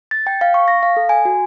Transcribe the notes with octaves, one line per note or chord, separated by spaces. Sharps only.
A6
G5
F5
C#6
A#6
F5
A4
G#5
F#4